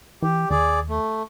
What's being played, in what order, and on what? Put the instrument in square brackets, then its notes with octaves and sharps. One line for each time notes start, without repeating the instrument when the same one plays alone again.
[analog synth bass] E3 [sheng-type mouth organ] G4
[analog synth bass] D#2 [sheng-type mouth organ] G#4 D5
[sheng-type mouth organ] A3